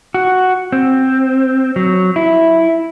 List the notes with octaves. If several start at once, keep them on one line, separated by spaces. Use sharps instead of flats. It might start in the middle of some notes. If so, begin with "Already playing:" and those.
F#4
C4
F#3
E4